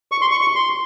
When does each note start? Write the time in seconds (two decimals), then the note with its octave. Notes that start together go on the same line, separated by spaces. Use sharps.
0.12 C#6
0.21 C6
0.31 C#6
0.41 C#6
0.56 C6